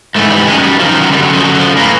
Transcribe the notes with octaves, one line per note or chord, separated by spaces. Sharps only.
G#2 E3 A3
G3
F#2 D#3 G#3
G#3
G3
F#2 D#3 F3
F3
F#3
F#2 D3 G3
F#3
F3
F#2 D3 F#3
F#3
F3
A2 E3 A#3